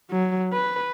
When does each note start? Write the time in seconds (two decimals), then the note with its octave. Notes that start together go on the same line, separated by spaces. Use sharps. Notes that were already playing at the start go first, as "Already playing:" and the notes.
0.11 F#3
0.53 B4